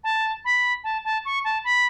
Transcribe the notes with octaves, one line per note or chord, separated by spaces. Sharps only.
A5
B5
A5
A5
C#6
A5
B5